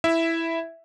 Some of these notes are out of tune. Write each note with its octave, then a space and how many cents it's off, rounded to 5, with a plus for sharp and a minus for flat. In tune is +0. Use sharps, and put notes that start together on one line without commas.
E4 +0 E5 +0